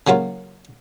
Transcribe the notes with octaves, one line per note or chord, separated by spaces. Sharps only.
C#3 F#3 A#3 F4